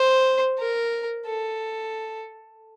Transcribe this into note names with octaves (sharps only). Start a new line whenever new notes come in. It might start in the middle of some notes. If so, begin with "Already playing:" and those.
Already playing: C5
A#4
A4